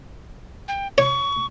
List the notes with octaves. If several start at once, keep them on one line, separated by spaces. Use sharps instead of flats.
G5
C#5 C#6